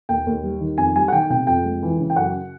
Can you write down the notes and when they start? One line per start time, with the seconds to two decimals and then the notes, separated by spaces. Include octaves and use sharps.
0.09 D#2 G5
0.27 D#2
0.44 G3
0.61 D#3
0.78 F2 G#5
0.95 G3 G#5
1.08 F#5
1.12 D#3 G5
1.30 C3 G5
1.47 F2 G5
1.65 G#3
1.83 E3
2.00 C#3
2.10 G5
2.16 F#2 F#5